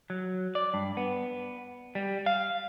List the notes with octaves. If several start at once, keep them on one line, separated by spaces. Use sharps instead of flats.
F#3
D5
G2
B3
G3
F5